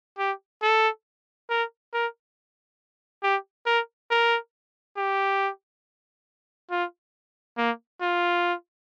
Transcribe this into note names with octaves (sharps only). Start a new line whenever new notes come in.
G4
A4
A#4
A#4
G4
A#4
A#4
G4
F4
A#3
F4